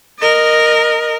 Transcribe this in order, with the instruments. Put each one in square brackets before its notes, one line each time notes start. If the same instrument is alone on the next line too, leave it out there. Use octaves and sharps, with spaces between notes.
[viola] A#4 D#5